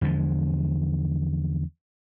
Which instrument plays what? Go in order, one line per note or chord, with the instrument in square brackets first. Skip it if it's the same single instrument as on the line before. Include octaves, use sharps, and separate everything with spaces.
[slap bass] E2 D3 F3 G#3